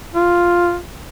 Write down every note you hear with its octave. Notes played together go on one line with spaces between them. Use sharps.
F4